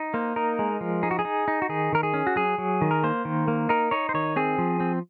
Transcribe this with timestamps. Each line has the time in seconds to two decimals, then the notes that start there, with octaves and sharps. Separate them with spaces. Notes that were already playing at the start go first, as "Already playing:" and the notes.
Already playing: D#4
0.14 A#3 C5
0.36 D#4 A#4
0.59 G#3
0.81 F3
1.03 D#4 G#4
1.11 F#4
1.19 G#4
1.25 D#4
1.48 D#4
1.62 F#4
1.69 D#3 G#4
1.93 D#3 A#4
2.03 G#4
2.14 C#4
2.27 F#4
2.36 F#3 G#4
2.58 F#3
2.81 D#3
2.91 A#4
3.04 A#3 C5
3.25 D#3
3.48 A#3
3.69 D#4 A#4
3.91 D#4 C#5
4.09 C5
4.14 D#3 C#5
4.36 C4 G#4
4.58 F3
4.80 C4